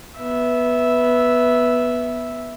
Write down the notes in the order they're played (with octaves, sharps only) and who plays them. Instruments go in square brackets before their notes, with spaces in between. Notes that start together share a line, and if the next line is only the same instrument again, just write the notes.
[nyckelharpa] B3 E5